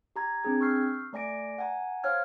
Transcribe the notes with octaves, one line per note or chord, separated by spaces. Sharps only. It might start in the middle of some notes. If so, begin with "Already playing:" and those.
G4 A#5 G#6
C4 D4 G#4 G#6
C#6 E6 F6 G6 C7
A3 D5 G#5 A#6 D7
F#5 G#5 A#5
C5 C#5 F5 F6 G#6